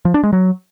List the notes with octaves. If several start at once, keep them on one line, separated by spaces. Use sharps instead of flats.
F3
D4
G#3
F#3